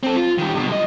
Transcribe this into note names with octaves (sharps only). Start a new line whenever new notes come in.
C4 A4
F4
D#3 G3
G2 B2
B1 D#5